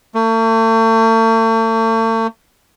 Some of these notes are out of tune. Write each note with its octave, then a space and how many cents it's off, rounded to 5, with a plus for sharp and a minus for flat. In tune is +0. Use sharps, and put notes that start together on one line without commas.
A3 +40